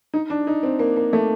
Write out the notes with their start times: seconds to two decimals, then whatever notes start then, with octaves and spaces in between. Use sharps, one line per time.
0.14 D#4
0.30 D4
0.47 D#4
0.63 C4
0.79 A#3
0.96 A#3
1.13 A3